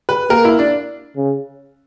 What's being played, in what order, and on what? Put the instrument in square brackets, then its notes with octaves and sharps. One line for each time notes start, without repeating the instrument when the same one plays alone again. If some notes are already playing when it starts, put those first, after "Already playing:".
[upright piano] B4
[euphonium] A#3 [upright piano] A#4
[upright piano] E4
D4
[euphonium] C#3